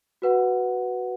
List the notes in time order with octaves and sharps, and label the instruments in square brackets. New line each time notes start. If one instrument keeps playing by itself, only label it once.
[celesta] F#4 B4 F#5